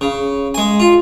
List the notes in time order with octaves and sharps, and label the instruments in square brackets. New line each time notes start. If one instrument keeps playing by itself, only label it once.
[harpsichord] C#3
G#3 G#5
F4